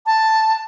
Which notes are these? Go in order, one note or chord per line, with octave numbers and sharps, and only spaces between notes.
A5